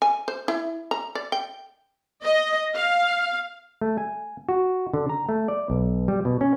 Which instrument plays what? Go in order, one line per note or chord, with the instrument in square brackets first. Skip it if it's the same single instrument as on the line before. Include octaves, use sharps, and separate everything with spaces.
[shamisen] G#5
C5
E4
A#5
D5
G5
[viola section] D#5
F5
[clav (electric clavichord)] A3
G#5
F#4
D3
A#5
A3
D5
B1
G3
B2
C#4